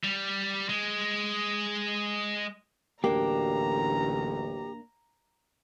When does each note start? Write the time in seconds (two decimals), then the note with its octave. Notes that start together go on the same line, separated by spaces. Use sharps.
0.04 G3
0.69 G#3
3.04 A1 D2 F#3 A#3 D4 G4 A#5